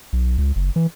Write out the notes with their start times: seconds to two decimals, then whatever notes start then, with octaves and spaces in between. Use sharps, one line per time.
0.13 B1
0.38 C#2
0.56 F#1
0.76 E3